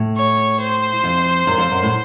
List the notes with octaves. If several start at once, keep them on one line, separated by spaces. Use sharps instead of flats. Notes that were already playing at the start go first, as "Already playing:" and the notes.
Already playing: A2
C#5
C5
F2
F#2
F2
F#2
A2